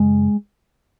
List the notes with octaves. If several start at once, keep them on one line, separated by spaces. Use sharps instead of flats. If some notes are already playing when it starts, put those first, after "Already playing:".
Already playing: F#2 C#3 G#3